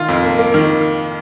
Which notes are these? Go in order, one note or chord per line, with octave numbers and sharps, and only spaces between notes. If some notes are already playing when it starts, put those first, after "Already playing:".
Already playing: D#3 F4
F2
A#3
A#3
D#3